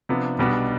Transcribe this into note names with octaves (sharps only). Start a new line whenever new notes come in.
C3 F3 B3 D4
B1 B2 G3 B3 D4